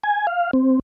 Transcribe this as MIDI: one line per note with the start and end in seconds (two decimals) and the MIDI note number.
0.04 0.27 80
0.27 0.51 77
0.53 0.79 60